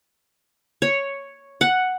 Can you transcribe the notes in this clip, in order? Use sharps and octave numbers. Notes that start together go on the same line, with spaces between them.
C#5
F#5